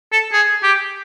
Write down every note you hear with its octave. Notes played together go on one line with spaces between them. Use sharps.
A4
G#4
G4